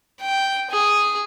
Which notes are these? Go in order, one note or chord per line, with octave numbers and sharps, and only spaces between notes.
G5
G#4